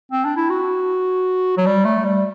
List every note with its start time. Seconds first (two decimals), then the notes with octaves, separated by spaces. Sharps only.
0.12 C4
0.25 D4
0.37 E4
0.50 F#4
1.57 F#3
1.66 G3
1.85 A3
2.05 G3